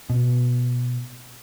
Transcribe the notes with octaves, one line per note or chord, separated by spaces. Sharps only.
B2